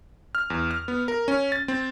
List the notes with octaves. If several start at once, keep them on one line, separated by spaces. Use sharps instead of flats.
F6
E2
F6
B3
A#4
C#4
A6
C4